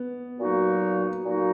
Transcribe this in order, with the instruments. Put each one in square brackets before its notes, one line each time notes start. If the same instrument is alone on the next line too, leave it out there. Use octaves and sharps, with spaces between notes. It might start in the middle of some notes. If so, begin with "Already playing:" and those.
Already playing: [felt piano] B3
[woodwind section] A#2 F#3 A#3 D#4 F#4
A#2 F#3 A#3 D#4 F#4